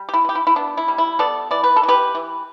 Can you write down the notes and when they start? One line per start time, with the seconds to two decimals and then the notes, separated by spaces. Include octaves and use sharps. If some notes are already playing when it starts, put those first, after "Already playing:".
Already playing: G3
0.09 G4
0.14 E4
0.25 E3 G4
0.35 E4
0.47 E4
0.56 B3 D4
0.77 E4
0.88 G3
0.98 E4
1.19 B3 A4 D5
1.51 E3 D5
1.64 B4
1.76 A4
1.83 E3
1.88 G4 B4
2.15 E3